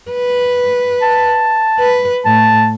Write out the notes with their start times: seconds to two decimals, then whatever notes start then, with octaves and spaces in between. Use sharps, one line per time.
0.11 B4
1.02 A5
1.80 B4
2.25 A2 A5